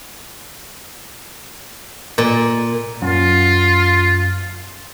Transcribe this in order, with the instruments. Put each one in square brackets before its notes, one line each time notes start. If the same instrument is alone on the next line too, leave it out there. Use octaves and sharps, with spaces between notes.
[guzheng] A#2
[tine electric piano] F#2 [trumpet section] F4